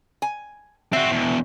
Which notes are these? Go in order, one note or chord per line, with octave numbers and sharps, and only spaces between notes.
G#5
C4 F#4 E5
E2 B2